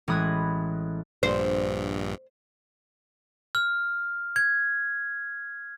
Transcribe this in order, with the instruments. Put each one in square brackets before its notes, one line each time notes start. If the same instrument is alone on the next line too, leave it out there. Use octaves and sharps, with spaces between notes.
[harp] A1 G#3 B5 D#6 F#6 G#6
[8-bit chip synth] A#1 G2 [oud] C5
[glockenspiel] F6
G#6